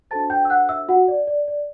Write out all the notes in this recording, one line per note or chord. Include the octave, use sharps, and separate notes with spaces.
D4 F#4 A4 C5 A5 A6
G5 G6
E6
F#5 F#6
E5 E6
F#4 F#5
D5
D5
D5